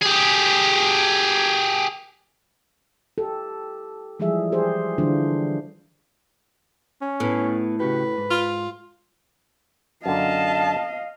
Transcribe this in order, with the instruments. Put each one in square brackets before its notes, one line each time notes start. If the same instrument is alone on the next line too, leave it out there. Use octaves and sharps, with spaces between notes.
[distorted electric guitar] G4 G#4
[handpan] G4 A4
E3 F3 G3 G#3 G#4 E5
G4 G#4 C5
D3 E3 G3 D4 F4 C5
[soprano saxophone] C#4
[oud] A2 [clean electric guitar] B3 B4
[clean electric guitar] C#3 F#4 G4 [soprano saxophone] B4
[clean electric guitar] G#2
[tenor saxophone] F4
[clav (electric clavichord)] F#2 D3 [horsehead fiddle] D#5 F5 [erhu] A5